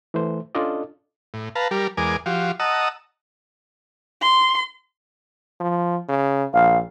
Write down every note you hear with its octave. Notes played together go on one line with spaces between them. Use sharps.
E3 A3 C5
C#4 D4 F4 A4 D5 D#5
A2
B4 F5 A5 A#5
G3 G4 A#4
E2 G#3 A#4 G#5 D6
F3 F#4 G4 F5
D#5 F#5 A5 A#5 D#6 E6
C6
F3
C#3
A#1 F5